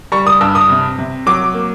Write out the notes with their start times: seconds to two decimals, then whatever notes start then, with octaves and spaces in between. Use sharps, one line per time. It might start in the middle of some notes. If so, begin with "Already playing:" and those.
0.12 G3 C#6
0.27 D#6
0.41 G2 E6
0.55 D#6
0.70 C3
0.98 C3
1.26 F#3 D6
1.54 A#3